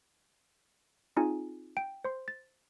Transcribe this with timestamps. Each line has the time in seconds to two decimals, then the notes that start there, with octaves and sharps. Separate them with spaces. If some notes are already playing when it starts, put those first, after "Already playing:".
1.17 C4 D#4 F4 G#4 G#5
1.77 G5 D7
2.05 C5 C6
2.28 A6